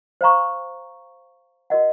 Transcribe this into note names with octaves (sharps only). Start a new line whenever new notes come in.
C5 F5 A#5 C#6
F#4 A#4 D#5 F#5